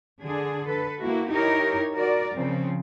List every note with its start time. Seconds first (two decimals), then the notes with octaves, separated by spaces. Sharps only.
0.21 D3 D4 G#4
0.67 A4 B4
1.01 A#3 E4 F#4
1.30 D#4 E4 G4 A#4 C#5
1.96 F#4 A#4 D5
2.34 C#3 F3 C4